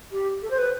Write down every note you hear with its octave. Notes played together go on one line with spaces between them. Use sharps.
G4
A4
C5
B4